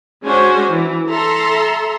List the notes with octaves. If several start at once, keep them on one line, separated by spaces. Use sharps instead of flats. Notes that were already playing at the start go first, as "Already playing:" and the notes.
G#3 C#4 D4 F#4 C5 G#5
E3
A4 E5 A#5 C6